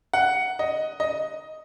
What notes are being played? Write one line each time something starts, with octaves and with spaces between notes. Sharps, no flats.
F#5
D#5
D#5